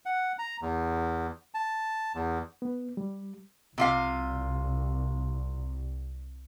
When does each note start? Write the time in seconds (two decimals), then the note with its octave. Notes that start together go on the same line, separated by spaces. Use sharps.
0.06 F#5
0.39 A#5
0.62 E2
1.54 A5
2.15 E2
2.62 B3
2.97 G3
3.78 C2 C3 F4 F5